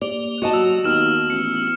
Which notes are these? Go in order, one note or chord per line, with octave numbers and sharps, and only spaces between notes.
A#3 G4 D5
F#4 D#5 A5
F#3 A#3 E6
D#2 B3 F6 E7
A1 C#7